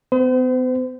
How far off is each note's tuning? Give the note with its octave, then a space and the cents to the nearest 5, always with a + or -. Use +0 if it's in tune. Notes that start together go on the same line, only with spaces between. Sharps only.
B3 +40 C5 -40